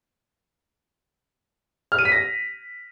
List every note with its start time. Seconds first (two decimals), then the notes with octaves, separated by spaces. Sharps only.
1.92 F6
1.99 D#7
2.05 B6
2.12 A#6